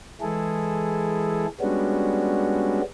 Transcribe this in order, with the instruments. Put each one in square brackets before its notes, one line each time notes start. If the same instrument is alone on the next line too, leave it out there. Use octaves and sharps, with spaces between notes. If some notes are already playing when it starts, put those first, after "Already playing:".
[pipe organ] E3 G#3 E4 G#4 A4
G3 G#3 B3 C#4 D4 F#4